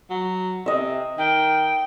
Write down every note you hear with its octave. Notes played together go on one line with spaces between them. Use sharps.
F#3
C3 D#5 E5
D#3 G5